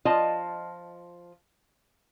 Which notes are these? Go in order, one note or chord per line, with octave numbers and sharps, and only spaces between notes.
F3 F4 D#5 A5